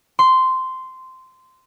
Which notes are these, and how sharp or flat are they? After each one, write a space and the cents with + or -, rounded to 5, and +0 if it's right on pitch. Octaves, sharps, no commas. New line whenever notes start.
C6 -10